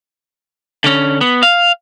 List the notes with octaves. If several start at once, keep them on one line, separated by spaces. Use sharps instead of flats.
D3 C#4
B3
F5